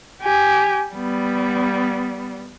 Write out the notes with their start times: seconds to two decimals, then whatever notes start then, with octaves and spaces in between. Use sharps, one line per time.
0.22 G4 G#5
0.94 G3 B3